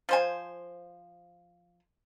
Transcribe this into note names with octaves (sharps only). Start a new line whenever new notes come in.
F3 C5 G#5